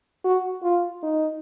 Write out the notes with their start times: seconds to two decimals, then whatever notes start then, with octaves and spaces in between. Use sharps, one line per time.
0.25 F#4
0.63 F4
1.03 D#4